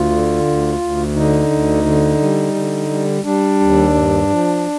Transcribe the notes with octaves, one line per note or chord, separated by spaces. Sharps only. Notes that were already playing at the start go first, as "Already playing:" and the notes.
Already playing: D2 F4
D3
D2
D2
D3 D#4
D2
D3
G3
D3
G3
G3 D4
D#2
G2
F3